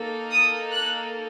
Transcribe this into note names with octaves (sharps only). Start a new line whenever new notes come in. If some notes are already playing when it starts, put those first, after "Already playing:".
Already playing: A#3 D#4 A4
D#6
F#6